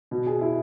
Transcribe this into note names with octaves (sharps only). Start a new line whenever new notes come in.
B2
G#4
E4